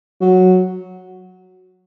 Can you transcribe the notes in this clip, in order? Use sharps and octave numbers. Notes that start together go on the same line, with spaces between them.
F#3